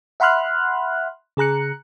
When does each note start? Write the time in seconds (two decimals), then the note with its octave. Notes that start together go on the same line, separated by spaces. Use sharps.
0.20 E5 F#5 B5 C6 F6 F#6
1.37 C#3 G#4 A#5 F#6 C#7